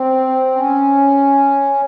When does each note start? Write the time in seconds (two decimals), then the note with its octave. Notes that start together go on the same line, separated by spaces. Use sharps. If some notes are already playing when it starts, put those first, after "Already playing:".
Already playing: C4
0.56 C#4